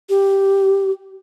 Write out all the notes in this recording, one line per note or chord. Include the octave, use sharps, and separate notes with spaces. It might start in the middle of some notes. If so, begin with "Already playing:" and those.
G4